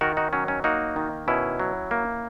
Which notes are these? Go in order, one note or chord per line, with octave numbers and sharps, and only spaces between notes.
D#3 F#4 A#4
D#4 F#4
F#3 C#4
C#4
A#3 D#4 F#4
D#3
B2 C#4 E4
F#3
A#3